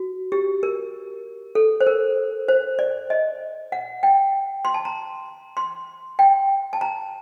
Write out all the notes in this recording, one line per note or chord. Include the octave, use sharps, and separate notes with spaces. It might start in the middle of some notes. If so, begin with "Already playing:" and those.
Already playing: F#4
G4
A#4
A4
C5
A#4
C5
D5
D#5
F#5
G5
C6
A5
A#5
C6
G5
A5
A#5